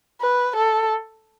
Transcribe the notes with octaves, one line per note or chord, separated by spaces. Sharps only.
B4
A4